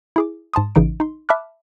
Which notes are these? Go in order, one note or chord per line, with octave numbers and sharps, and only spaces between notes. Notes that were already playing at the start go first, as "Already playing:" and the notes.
E4 G#4 D6
G#2 A5 C6 D#6
A1 C#3 E3 D#4 D7
D#4 C6
E5 A5 B5 D6 F6 F#6